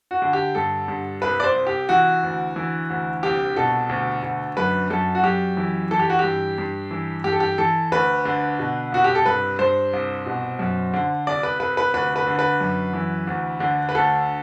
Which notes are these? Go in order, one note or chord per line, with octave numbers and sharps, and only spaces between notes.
F#4
D3
G4
G2 A4
G2
C2 B4
D5
C5
C2
G4
E3 F#4
D2
E3
D2
C2 G4
B2 A4
D2
D2
F#2 B4
F#2 A4
F#4
F#2 G4
E3
E3 A4
G4
F#4
G2 G4
G2
E3
G2 G4
A4
G4
E3 A4
D2 B4
D3
B2
C2 F#4
G4
A4
G2 B4
G2 C5
C2
B2
F#2
D3
C2 D5
B4
C2 B4
B4
D2 B4
B4
D3
B4
F#2
E3
D2
D3
B4
D2 A4